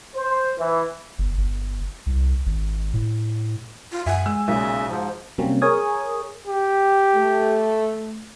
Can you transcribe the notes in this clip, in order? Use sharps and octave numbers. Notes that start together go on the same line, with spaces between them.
C5
E3
G1
G1
C2
G#1
A2
F4
F#2 E5 F#5 G#5
G#3 E6
B1 A#2 C#3 E5
G#2 F3
C3 F#3 G3 A#3 C4 C#4
G#4 A#4 C#5 G#5 D#6
G4
A3